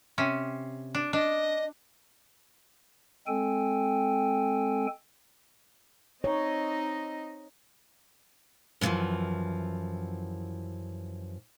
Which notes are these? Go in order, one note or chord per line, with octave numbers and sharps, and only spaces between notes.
C3 C#4
D4
D4 D#5
G#3 C4 A4 G5 G#5
C4 D#4 C#5 D#5
F#2 A2 D3 E3 F3